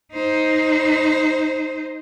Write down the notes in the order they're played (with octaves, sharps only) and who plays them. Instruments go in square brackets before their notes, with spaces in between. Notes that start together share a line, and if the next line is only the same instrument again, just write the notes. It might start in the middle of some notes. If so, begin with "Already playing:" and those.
[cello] D#4 C5